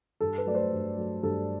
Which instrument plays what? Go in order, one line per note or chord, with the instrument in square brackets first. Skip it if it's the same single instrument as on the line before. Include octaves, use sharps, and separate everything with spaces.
[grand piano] G2 A4
B4
F#3 A3 D5
C5
G2
F#3 A3
G2 A4